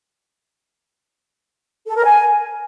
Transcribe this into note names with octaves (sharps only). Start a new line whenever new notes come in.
A4
A#4
G#5